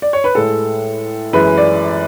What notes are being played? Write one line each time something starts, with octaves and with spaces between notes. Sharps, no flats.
D5
C#5
B4
A2 G#3 A4
F#2 E3 G#3 B4
D5